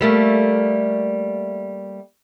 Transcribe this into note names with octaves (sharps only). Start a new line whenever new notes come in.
G3 A3 A#3